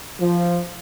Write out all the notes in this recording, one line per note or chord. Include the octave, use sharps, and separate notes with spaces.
F3